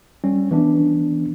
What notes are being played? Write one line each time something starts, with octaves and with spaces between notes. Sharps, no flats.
G3 C#4
E3 B3 D4